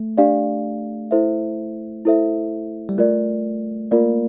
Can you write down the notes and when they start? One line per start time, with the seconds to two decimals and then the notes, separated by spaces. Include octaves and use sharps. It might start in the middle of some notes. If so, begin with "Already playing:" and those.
Already playing: A3
0.18 D4 G4 D5 F5
1.11 E4 A4 C5 E5
2.05 E4 A4 C5 E5
2.89 G3
2.98 A3 F4 A#4 D5
3.91 A#3 F4 A#4 D5